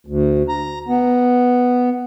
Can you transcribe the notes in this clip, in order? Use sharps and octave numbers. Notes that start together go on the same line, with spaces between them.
D2
A#5
B3